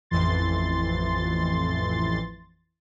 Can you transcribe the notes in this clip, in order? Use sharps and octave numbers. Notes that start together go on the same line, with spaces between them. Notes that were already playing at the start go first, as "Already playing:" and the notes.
A1 F2 E3 C6 A6